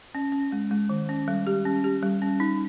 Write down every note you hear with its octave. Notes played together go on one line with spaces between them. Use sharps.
C#4
C#4
G#3
G#3
D#3
C#4
G3
G4
C#4
G4
G3
C#4
D#4